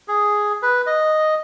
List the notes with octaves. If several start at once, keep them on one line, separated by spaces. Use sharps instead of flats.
G#4
B4
D#5